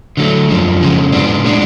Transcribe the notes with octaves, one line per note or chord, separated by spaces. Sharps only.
D3 F#3 A3
F#2 F3 G#3
F2 C#3 G#3
G#2 G#3 B3 D4
A2 G#3 D4